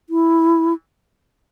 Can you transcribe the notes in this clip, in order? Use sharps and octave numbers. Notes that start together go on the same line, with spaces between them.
E4